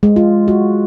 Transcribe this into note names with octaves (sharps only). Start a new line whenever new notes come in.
G#3
F4
F#4